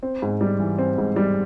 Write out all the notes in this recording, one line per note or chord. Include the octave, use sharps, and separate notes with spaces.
C4
G#2
G3
E3
C4
G#2
G3